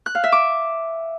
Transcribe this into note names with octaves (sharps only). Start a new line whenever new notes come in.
F#6
F5
E5
D6